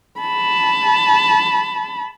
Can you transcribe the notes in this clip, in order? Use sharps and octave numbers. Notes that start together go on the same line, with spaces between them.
A5 B5